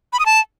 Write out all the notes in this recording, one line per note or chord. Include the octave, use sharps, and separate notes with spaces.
B5
D#6
A5